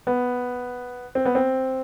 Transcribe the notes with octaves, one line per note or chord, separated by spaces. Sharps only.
B3
C4
B3
C4